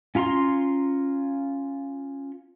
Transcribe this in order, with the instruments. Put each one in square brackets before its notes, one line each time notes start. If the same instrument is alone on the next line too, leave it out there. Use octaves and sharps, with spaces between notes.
[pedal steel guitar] C#4 F4 A#5 C6